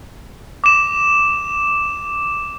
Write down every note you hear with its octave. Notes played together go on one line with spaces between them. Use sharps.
D6 E7